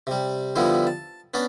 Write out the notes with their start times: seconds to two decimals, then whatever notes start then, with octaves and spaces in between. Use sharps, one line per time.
0.07 C3 G3
0.56 D3 F3 G3 B3 E4
0.87 A5
1.34 B3 C#4 D4 D5